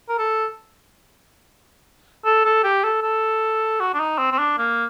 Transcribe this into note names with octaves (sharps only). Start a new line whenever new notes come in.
A#4
A4
A4
A4
G4
A4
A4
F#4
D4
D#4
C4
C4
D4
A#3